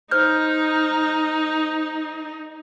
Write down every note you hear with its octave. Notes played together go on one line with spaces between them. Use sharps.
D#4 C5 F6 G6